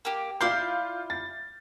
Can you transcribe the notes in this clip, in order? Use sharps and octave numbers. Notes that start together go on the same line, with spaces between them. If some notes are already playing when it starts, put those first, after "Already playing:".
A#3 G4
E4 F4 D5 C6 F6 G6
A6